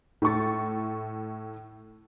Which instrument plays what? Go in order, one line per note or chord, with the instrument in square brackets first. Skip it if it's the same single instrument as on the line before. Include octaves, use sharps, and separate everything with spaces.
[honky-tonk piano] A2 E4 C#6 A6